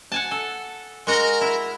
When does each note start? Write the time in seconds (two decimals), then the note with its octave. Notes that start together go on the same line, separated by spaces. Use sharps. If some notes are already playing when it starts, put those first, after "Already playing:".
0.12 F#5 G#5 A5
0.31 A4
1.07 G#3 F#4 A#4 D#5
1.41 E4